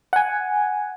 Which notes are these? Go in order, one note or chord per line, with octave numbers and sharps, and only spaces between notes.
F#5 G#5